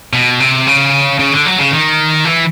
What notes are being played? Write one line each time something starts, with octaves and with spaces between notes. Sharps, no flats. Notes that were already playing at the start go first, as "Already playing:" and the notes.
B2
C3
C#3
C#3
D3
F#3
C#3
D#3
E3